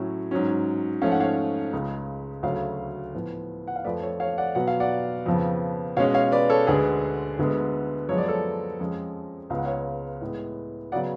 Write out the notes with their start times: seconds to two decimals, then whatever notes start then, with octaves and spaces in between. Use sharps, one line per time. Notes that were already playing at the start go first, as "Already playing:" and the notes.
Already playing: A2 F#3 C#4
0.31 G#2 F#3 C#4
1.02 G#2 F3 A3 C#4 F5
1.11 F#5
1.20 C#5 F5
1.73 C#2 C#3 G#3
2.43 D2 C#3 F#3 A3 C#5 F5
3.14 A2 F3 B3
3.67 F#5
3.76 F5
3.84 F2 F3 A3 B4 D5
4.02 A4 C#5
4.20 C#5 F5
4.38 D5 F#5
4.55 B2 F#3 B3 F#5
4.68 F5
4.80 D5 F#5
5.26 F2 C#3 F3 B3
5.97 B2 G#3 C#4 C#5 F5
6.14 C#5 F5
6.32 B4 D5
6.50 A4 C#5
6.67 D2 D3 G#3 G#4 B4
7.39 D2 D3 G#3 B3
8.09 F#2 F3 G#3 B3 C#5
8.18 D5
8.28 A4 C#5
8.80 F2 F3 G#3 C#4
9.50 C#2 C#3 G#3 B3 F5
9.58 F#5
9.65 C#5 F5
10.21 A2 G#3 B3
10.92 C#3 F#3 B3 D5 F#5